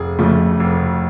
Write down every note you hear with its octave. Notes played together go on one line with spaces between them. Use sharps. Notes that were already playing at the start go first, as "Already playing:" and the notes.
Already playing: F1 G#4
F2 C#3 F3 A3
F1